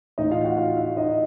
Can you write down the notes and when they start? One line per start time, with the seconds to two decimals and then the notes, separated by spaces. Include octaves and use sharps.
0.18 A2 E3 D#4 D#5
0.31 F4 F5
0.44 F#4 F#5
0.57 F4 F5
0.77 E4 E5
0.97 D#4 D#5